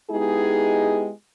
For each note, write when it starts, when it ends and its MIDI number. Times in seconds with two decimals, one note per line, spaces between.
0.10 1.09 56
0.10 1.09 59
0.10 1.09 63
0.10 1.09 64
0.10 1.09 67
0.10 1.09 68